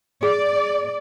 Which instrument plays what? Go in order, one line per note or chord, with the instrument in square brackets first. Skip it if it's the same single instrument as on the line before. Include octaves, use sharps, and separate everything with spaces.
[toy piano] G#4 [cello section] D5